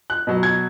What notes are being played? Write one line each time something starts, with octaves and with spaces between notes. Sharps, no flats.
F#6
B2 F#3
G#6